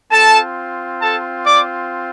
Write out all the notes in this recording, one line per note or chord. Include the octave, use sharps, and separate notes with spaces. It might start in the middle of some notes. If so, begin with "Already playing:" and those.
C4 F4 A4 A5
A4 A5
D5 D6